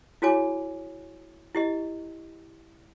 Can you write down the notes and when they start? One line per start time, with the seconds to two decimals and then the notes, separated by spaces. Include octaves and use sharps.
0.22 E4 F#4 G#4 C#5 G#5 D6
1.55 E4 G4 D#5